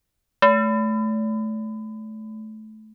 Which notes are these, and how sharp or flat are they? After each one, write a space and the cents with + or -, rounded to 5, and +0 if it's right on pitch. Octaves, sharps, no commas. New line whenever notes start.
A3 -20